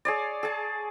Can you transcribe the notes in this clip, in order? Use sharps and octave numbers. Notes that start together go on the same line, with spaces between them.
G#4 C#5 D5
G#4 A5